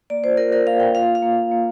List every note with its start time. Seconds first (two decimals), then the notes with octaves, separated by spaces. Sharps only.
0.10 A#3 D5
0.24 F4 C5
0.37 F4 A#4
0.52 F4 A#4
0.66 A#3 F5
0.80 A#3 G5
0.95 F4 F5
1.08 A#3
1.15 F5
1.22 A#3
1.37 A#3
1.51 A#3